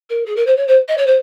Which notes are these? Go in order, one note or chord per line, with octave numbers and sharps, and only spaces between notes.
A#4
G#4
A#4
C5
C#5
C5
D#5
C#5
C5